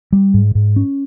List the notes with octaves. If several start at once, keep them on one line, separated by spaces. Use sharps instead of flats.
G3
G#2
G#2
C#4